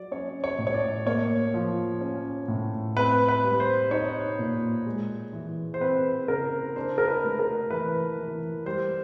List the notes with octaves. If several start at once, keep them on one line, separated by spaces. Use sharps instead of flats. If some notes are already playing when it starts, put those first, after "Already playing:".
Already playing: F#3 D5
C#4 C#5
C#5
A2
C#5
D5
A#3 C#5
F3
C#4
A2
C4 B4
B4
G3
C5
D#4 C#5
A#2
G#3
E3
C5
C4 B4
C#3 A#4
D4 C5
A#4
B4
A3
A#4
E3 B4
E3
G3 C5